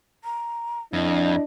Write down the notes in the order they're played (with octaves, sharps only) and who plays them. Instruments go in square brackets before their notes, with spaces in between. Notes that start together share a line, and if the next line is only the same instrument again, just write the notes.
[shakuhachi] A#5
[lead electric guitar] F2 [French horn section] D4 E4 [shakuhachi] D#5